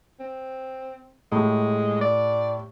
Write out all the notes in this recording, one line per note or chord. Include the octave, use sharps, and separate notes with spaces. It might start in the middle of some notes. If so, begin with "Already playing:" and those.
C4
A2 G#3 G4
D5